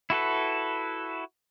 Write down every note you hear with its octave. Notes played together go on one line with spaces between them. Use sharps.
E4 F#4 A4 B4